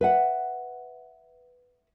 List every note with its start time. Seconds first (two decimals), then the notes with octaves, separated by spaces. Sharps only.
0.01 B4 E5 F#5